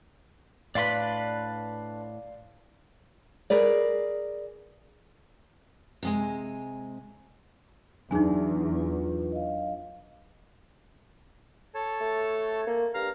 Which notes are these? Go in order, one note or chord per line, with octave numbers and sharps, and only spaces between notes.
A2 D4 B4 D5 F5 B5 C6
G#4 A#4 B4 D5
C3 G#3 G#5
E2 F#3 D4 D#4 G#4 G#5
F4 B4
D#5 F5
A4 C#5 A5
A3
A#3
G2 F5 A#5 F6